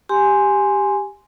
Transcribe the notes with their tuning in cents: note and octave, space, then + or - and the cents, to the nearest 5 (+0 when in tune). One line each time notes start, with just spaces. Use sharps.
G4 +0 G#5 +0 C6 +0